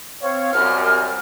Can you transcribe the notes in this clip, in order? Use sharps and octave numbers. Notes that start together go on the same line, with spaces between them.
C4 C#5 F5
C2 F#2 F6